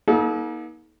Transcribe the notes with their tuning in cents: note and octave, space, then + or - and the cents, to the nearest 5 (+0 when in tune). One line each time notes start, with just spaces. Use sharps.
A#3 +45 D#4 +35 A4 -35